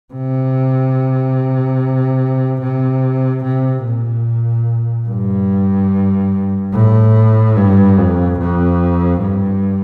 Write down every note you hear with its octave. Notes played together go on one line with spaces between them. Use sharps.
C3
C3
C3
A#2
G2
A2
G2
F2
F2
G2